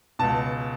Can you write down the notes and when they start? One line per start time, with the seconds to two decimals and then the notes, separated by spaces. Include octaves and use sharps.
0.19 C#2 B2 A5